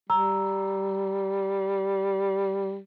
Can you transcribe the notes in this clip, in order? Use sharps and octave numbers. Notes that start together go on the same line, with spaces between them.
G3 A#5 E6